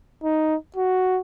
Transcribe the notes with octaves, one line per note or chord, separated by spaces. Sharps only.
D#4
F#4